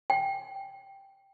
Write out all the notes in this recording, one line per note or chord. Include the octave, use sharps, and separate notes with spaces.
G5